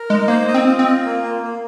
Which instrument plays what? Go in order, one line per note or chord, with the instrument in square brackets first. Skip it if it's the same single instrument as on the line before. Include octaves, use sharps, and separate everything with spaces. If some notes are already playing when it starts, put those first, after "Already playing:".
Already playing: [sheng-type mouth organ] A#4
[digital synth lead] G#3 [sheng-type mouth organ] D#4
[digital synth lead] A#3 [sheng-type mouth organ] C5
[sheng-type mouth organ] D#5
[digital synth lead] C4
[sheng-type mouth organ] F4
[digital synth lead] C4
[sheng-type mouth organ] F4
A#3
A#3
A#3